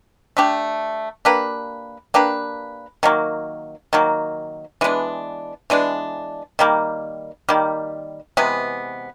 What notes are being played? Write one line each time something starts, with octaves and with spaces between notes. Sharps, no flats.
A3 D4 G4
A#3 D4 G4 B4
A#3 D4 G4 B4
D#3 F#3 A#3
D#3 F#3 A#3
E3 G#3 B3 D4
E3 G#3 B3 D4
D#3 G3 A#3
D#3 G3 A#3
C3 E3 G#3 B3